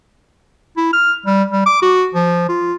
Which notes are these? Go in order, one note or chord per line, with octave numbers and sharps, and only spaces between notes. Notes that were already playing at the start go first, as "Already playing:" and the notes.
E4
F6
G3
G3
D6
F#4
F3
F4